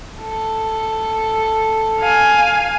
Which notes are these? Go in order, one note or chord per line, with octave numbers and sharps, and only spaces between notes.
A4
F5 G#5